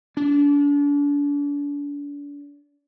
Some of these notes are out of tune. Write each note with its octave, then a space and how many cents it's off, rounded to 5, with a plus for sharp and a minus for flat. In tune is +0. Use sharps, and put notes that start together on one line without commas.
D4 -35